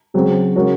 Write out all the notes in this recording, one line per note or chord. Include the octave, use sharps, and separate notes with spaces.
C#3 F#3 C4
C#3 G#3 C#4 F#4 A#4